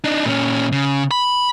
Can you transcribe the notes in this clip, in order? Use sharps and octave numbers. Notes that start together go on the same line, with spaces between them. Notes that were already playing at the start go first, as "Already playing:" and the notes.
D4 D#4
A#2 C#4
C#3
B5